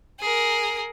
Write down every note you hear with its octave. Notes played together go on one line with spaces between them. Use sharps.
G#4 A#4